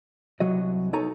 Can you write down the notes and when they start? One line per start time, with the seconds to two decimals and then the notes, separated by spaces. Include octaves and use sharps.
0.40 C2 F#3 F#4 D#5
0.93 B3 D#4 A4 C#5 G#5 A#5